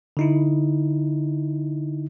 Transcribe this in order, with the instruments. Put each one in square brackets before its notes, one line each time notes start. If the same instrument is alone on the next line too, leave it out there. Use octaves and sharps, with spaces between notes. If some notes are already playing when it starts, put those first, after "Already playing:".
[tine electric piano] D3 D#4 E4